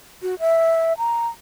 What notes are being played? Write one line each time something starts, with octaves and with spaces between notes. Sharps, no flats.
F#4
E5
A#5